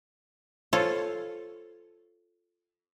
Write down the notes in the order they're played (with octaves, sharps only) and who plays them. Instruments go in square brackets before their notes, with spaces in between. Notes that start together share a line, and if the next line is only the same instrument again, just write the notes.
[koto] F4 A4 C5 C#5